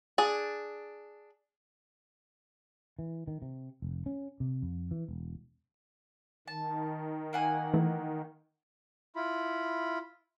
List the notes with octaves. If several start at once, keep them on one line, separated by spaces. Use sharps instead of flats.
D4 G#4
E3
D#3
C3
F1
C#4
C3
F2
E3
E1
D#3 A5
A#3 F#5 G#5
E3 A3
E4 F4 B5